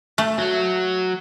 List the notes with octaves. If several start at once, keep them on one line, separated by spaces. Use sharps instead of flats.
A3
F#3